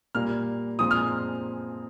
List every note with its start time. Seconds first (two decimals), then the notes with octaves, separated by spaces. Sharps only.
0.15 A#2 G3 A#3 F6
0.79 A#2 F3 G#3 C4 D#6
0.91 F6